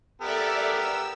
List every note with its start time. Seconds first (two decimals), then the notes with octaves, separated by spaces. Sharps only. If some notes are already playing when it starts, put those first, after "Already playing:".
0.22 B3 G4 A4 A#4 D5 E5
0.76 E6